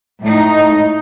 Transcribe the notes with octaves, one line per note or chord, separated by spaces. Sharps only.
A2 D#4